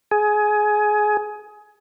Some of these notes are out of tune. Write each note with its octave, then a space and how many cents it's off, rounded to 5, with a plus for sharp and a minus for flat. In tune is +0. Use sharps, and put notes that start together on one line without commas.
G#4 +20